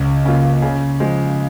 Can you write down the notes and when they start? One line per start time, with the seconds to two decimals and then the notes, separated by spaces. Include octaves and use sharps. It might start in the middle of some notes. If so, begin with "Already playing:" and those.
Already playing: C#2
0.25 C#3 A#3 F4
0.62 C#3
1.00 F3 G#3